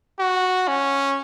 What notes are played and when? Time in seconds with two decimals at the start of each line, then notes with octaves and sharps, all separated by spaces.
0.19 F#4
0.68 C#4